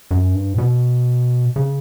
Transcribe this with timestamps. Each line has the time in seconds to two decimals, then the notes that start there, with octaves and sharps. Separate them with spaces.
0.11 F#2
0.34 G2
0.53 A2
0.58 B2
1.56 C#3